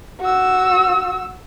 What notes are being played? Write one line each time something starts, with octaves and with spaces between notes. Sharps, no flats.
F#4 E6